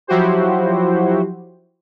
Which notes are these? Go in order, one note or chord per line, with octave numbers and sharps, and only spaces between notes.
F3 F#3 E4 F#4 G4 C5